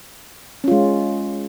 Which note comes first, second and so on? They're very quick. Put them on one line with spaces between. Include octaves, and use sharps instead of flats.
C#4 F4 G#3